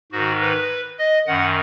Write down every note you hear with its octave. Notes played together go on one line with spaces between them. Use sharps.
G#2 D#3 F#4
B4
D#5
F#2 D#3 F#5